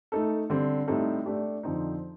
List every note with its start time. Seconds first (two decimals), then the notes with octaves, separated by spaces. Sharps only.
0.12 A3 D#4 A4
0.50 D3 G3 C4
0.88 A2 G3 C4 D#4 A4
1.25 A3 D4 G4
1.63 F2 D3 F3 C4 D#4